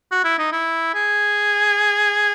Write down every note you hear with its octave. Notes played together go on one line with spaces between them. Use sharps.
F#4
E4
D#4
E4
G#4